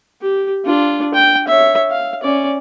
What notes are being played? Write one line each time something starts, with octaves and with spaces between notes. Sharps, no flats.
G4
D4 F4
G5
C#5 E5
F5
C#4 D5